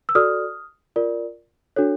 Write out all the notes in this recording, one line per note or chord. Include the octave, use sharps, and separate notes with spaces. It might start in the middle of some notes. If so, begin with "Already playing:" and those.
E6
F#4 A4 D5 D#6 F6
F4 A#4 D5
D4 F#4 A4 C#5